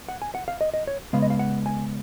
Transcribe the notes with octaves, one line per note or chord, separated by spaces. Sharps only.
F#5
G#5
F#5
F5
D#5
D#5
C#5
C#3 G#3 B3 F5
D#5
F5
F#5
G#5